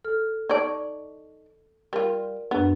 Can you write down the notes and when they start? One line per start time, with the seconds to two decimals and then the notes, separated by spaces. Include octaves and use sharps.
0.05 A4 F6
0.50 D#4 D5 A5 C#6 G#6
1.93 G3 F4 A#4
2.51 F#2 B3 D4